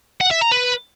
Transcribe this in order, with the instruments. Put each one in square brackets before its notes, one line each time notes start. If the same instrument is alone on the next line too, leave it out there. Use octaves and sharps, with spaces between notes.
[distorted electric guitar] F#5
E5
A#5
B4